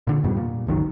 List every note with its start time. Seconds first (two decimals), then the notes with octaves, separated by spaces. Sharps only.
0.07 A#2 D3
0.24 F2 G#2 B2 G3
0.37 A#2
0.67 G1 C#2 D#3 F#3